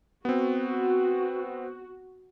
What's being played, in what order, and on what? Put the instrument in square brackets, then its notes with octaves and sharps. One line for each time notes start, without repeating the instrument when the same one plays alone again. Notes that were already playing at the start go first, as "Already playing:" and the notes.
[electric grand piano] B3 C4 [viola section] F#4